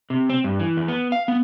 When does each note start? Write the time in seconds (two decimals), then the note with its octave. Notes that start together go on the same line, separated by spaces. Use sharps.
0.10 C3
0.29 C4
0.44 G2
0.59 E3
0.77 E2
0.88 B3
1.12 F5
1.28 B3